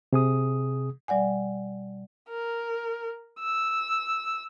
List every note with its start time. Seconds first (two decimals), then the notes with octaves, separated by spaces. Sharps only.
0.13 C3 G#4 D#6
1.08 B2 G3 D5 F#5 G#5
2.29 A#4
3.40 E6